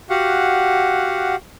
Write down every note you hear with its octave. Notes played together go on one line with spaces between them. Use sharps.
F#4 G4 F5 F#5